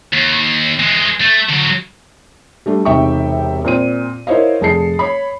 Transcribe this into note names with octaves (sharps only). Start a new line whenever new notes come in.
D#2
E3 G#3
A3
D3 F#3
G3 A3 D4
E1 C3 D#4 E5 G5 C#6
A#2 C4 D#7
E4 A#4 C5 C#5 D#5 F5
F1 G#4 A5 C7 C#7
C#5 B5